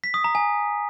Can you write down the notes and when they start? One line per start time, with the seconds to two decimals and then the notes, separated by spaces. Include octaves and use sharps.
0.04 B6
0.14 D#6
0.24 A#5
0.35 G#5